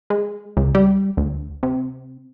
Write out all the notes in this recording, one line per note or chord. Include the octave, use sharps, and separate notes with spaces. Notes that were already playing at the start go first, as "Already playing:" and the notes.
G#3
C#2
G3
D2
C3